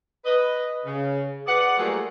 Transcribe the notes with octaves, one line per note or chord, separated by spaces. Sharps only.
B4 D#5
C#3
G#4 B4 D5 F#5
F#3 G3 A3 A#3 F4 G#4